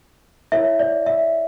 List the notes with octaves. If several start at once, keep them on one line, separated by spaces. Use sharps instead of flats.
E4 A#4 C#5 E5
D5
E5